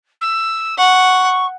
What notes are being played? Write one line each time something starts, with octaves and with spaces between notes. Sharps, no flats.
E6
F#5 C#6